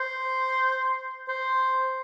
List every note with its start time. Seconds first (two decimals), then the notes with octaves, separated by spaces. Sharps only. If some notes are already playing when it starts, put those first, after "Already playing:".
Already playing: C5
1.28 C5